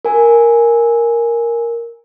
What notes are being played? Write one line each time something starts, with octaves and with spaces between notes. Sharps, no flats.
A#4 G#5